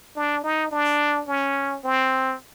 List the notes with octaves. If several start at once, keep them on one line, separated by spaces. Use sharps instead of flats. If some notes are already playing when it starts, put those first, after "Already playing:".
D4
D#4
D4
C#4
C4